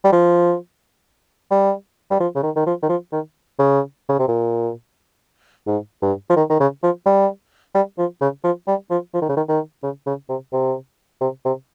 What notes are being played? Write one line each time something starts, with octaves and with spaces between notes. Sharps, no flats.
G3
F3
G3
G3
F3
C#3
D#3
D#3
F3
D#3
F3
D#3
C#3
C#3
C3
A#2
G#2
G2
F3
D#3
D#3
C#3
F3
G3
G3
F3
C#3
F3
G3
F3
F3
D#3
C#3
D#3
D#3
C#3
C#3
C3
C3
C3
C3